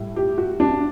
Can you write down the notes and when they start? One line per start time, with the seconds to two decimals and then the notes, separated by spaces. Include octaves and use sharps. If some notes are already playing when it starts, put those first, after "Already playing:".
Already playing: A2 G3
0.16 G4
0.38 F#4
0.60 D4